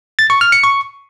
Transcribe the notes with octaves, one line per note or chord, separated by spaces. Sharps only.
A6
C#6
F6
C#7
C#6